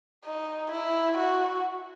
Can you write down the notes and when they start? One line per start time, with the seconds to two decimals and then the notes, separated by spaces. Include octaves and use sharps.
0.25 D#4
0.71 E4
1.17 F#4